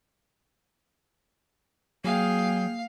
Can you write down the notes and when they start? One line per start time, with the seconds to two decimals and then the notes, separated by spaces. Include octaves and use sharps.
2.04 F#3 A#3 G#4 F5 G5